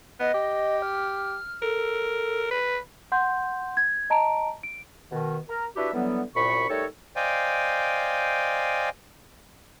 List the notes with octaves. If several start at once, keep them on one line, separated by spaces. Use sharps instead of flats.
B3 D#5
G4
F6
A4 A#4
B4
F#5 C6 G6
G#6
D#5 A5 A#5 D7
D7
B2 D#3
A#4
D4 E4 F#4 G4 B4 E5
D3 E3 F#3 G3 B3
C2 F#2 A#2 B5 C#6
G3 A3 D#4 A4 A#4 C#5
C5 D5 D#5 F5 G5 G#5